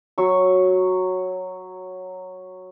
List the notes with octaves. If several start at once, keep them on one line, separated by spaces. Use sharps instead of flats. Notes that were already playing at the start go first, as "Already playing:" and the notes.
F#3 C#6 E6